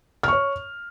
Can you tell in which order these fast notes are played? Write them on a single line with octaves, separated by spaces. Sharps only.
F6 C#6 C#5